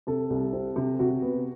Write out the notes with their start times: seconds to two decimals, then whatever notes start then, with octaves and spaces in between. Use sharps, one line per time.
0.07 C3 A4
0.30 C2
0.53 C4
0.76 C3
0.99 C3 F#4
1.22 B3